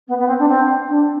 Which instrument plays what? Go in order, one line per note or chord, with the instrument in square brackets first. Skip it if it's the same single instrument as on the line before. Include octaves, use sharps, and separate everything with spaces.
[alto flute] B3
B3
C4
D4
C4
D4